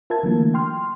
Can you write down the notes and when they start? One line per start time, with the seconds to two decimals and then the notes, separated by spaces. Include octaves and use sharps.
0.10 F4 A#4 E5 A5 G#6
0.23 D3 E3 F#3 A3 A#3
0.54 G5 C6 F6